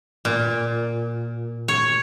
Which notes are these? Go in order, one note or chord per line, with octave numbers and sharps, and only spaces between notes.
A#2
C#5